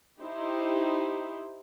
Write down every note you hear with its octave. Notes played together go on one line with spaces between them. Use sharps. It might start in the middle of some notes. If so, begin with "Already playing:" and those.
D#4 E4 G4 C5